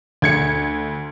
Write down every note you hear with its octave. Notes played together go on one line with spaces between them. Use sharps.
D2 G#6 C#7